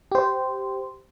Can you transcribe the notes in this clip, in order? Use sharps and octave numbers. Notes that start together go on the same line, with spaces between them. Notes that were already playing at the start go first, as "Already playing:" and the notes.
G4 C5